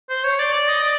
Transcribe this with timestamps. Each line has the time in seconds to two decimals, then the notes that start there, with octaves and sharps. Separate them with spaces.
0.09 C5
0.23 C#5
0.39 D5
0.53 D5
0.68 D#5
0.82 D5